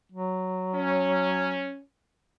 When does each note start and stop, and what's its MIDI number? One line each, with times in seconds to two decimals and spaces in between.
0.12 1.73 54
0.75 1.80 61